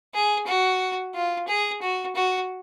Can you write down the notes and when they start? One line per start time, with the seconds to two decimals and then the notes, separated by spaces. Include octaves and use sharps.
0.14 G#4
0.47 F#4
1.15 F4
1.48 G#4
1.82 F#4
2.15 F#4